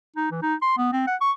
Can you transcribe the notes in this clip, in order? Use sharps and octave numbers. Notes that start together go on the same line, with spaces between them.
D#4
E3
D#4
C6
B3
C4
F#5
C#6